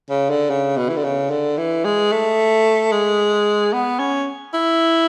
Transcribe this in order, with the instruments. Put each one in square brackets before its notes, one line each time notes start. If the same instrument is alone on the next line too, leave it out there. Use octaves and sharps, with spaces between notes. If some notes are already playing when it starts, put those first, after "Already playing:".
[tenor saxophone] C#3
D3
C#3
B2
E3
D3
C#3
D3
E3
G#3
A3
G#3
B3
C#4
E4